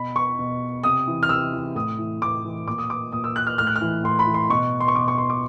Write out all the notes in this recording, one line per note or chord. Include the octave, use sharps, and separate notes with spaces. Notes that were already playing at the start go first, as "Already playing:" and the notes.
Already playing: B2 B5
C#6
B2
C3 D#6
E3
F6
C3 E6
E3
A2 D#6
E3
A2 D6
E3
A#2 D6
D#6
D6
A#2 D#6
E6
F#6
F6
A2 F6
F#6
F6
E3
A2 C6
B5
E3
C6
B2 C#6
C6
C#6
B2 D6
C#6
C6
D6